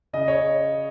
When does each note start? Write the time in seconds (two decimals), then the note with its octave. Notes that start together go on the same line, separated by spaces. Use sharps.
0.13 C#3 D#5
0.28 C#5